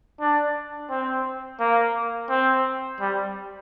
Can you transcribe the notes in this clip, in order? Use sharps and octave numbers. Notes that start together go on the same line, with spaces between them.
D4
C4
A#3
C4
G3